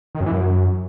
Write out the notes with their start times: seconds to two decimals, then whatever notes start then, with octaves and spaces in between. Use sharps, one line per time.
0.15 D#3
0.20 F#2
0.26 E3
0.32 F#2